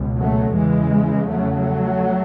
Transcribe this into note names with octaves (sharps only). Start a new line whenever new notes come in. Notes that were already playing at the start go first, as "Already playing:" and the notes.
Already playing: C#2 B2
F#3 A3
E2 C#3 E3 G#3
F#3 A3